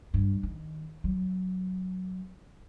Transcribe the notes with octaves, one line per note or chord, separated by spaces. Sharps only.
G2
D#3
F#3